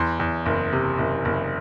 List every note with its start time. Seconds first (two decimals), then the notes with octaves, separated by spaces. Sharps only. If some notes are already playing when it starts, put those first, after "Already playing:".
Already playing: E2 C6
0.20 E2
0.46 F#1
0.73 C3
0.98 F#1
1.25 F#1